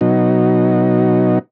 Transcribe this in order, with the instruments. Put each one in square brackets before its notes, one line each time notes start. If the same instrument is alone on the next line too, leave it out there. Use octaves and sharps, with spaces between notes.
[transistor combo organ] B2 F#3 D#4